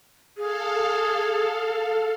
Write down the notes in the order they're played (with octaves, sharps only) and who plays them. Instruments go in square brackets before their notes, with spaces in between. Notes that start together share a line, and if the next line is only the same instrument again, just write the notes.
[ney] G#4 [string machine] A4 F5